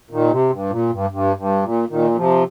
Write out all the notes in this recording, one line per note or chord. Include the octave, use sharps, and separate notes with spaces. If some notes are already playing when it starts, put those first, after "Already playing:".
A#2 D#3
C3
G2
A#2
G2
G2
G2
A#2
A#2 D#3
D#3
C3 F3